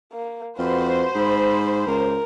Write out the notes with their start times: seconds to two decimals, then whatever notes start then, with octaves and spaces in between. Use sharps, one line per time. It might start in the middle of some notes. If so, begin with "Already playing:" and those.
0.13 A#3
0.59 F2 F#4 B4 C5
1.15 G#2 B5
1.87 C#2 A#4